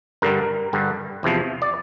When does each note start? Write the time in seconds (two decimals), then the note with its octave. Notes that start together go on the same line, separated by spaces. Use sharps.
0.22 G2 D3 G3 A#4
0.73 G2 D3 G3
1.23 E2 C3 F3
1.62 D5